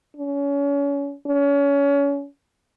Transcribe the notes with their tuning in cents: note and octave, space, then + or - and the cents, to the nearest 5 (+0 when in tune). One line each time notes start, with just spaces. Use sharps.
C#4 +30
C#4 +30